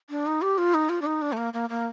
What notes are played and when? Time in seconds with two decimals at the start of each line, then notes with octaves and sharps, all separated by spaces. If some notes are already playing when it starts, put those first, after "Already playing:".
0.10 D4
0.26 D#4
0.42 G4
0.58 F4
0.74 D#4
0.89 F4
1.02 D4
1.06 D#4
1.22 D4
1.32 A3
1.37 A#3
1.53 A#3
1.70 A#3